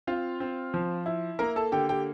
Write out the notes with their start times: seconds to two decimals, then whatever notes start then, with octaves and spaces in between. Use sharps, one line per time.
0.07 C4 F4 F5
0.40 C4
0.74 F3
1.06 E4
1.39 A#3 A#4 A#5
1.56 A4 A5
1.72 D3 G4 G5
1.89 G4 G5